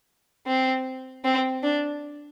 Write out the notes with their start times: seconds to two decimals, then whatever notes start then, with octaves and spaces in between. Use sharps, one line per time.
0.47 C4
1.25 C4
1.63 D4